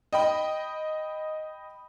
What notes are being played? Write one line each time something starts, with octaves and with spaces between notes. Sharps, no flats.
D#5 G5 B5